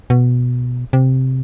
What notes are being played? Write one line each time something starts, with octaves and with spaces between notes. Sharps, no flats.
B2
C3